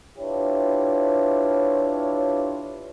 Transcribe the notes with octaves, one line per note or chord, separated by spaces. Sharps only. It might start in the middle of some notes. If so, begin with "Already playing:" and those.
D4 E4 F4 G4 B4 C#5